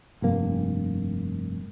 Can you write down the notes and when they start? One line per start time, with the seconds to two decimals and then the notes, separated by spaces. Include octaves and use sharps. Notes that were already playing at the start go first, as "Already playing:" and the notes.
0.22 F1 G2 A#3